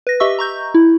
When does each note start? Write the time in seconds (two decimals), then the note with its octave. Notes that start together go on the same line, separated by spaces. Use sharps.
0.07 B4 A#6
0.20 G4 D#5 E5 C#6 E6
0.39 A#5 C#6 G6
0.74 E4